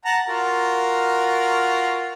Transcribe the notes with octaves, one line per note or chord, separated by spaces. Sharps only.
F#5 A5 A#5
F4 F#4 A#4